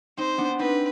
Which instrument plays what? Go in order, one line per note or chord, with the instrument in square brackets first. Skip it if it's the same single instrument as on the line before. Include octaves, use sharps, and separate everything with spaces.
[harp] C4 D#4 [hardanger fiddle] C5
[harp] B3 D4
[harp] C4 D#4 [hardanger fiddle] B4